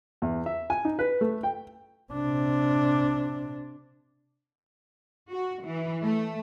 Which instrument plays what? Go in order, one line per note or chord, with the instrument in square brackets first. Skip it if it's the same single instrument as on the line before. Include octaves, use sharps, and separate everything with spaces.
[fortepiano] E2
E5
G#5
D#4
B4
A3
G5
[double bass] C3 D4
[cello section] F#4
E3
A3